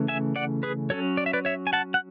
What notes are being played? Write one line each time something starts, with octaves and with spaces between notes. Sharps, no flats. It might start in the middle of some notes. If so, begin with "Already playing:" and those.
Already playing: C#3 E3 A3 C#4
E5 G#5
D5 F#5
G#4 B4
F#3 C#4 A4 C#5
D5
E5
B4 D5
C#5 E5
G#5
F#5 A5
F#5